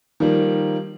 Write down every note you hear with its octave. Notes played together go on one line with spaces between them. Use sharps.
D#3 F3 G3 A#3